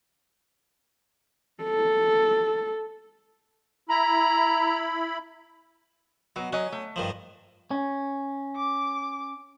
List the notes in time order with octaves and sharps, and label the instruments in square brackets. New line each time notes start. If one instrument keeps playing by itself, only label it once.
[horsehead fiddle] A4
[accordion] E4 B5 [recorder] A#5
[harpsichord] B2 [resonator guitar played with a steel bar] F#3
[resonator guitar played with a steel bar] F#3 D#5 [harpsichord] C#4
[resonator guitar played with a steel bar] A3
[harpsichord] G2 D#3 F3
[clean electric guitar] C#4
[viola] D6